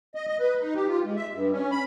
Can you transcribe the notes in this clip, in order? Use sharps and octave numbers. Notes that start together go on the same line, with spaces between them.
D#5
D#5
B4
D#4
G4
F4
G#3
E5
G2
C#4
B5